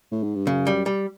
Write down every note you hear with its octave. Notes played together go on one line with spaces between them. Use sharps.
A2
G#2
G2
F#2 C#3
G3
G3